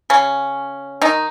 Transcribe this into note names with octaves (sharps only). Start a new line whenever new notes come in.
C#3 C#4
D#3 D#4